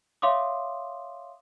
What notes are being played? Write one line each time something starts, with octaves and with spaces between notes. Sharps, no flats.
C#5 E5 F5 C6 D6 D#6